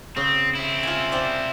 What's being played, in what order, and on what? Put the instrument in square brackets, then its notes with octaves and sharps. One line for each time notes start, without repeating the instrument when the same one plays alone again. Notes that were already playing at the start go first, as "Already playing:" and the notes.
[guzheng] C#3 [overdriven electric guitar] C4
[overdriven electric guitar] C4 E4
[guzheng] F4 G#5
C5 D5 G5